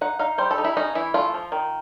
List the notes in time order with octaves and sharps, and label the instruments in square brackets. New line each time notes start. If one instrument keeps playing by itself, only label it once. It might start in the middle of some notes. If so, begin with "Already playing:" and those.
[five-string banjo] D#4 F#5
D#4 F5
G3 C5
A4
D#4
E4
C#4 D#4
E3 E4
A3 F4
F3
D#3